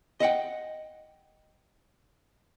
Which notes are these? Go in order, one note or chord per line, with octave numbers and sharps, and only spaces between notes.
D#5 E5 F#5 G5